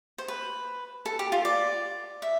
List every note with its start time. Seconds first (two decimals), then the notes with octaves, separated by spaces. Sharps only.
0.18 C5
0.28 B4
1.06 A4
1.19 G4
1.32 F4
1.45 D5
2.22 E5